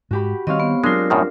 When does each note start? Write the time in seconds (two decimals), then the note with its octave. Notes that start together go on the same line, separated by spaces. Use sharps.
0.11 G#2 F#4 G4 B5
0.47 D#3 G3 C4 C#5 D#5 F5
0.60 B3
0.84 F#3 G#3 B3 D4 F4 A#4 C7
1.10 F#2 A2 D#3